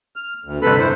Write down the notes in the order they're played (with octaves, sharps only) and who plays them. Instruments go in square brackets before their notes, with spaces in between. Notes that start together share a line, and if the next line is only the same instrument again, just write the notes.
[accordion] F6
D2
[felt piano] G1 C3 [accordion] A4 B4 B5
[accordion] F2 E4 C5